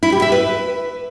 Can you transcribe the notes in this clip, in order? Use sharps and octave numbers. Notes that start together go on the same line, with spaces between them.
E4
G4
E5
B4